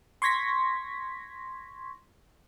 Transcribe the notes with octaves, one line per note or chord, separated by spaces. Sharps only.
C6 C#6 G#6 A#6 B6